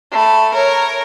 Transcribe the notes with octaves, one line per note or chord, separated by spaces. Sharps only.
A3 B5
A#4 C#5